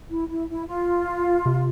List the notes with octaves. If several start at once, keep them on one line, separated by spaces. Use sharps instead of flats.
E4
E4
E4
F4
C3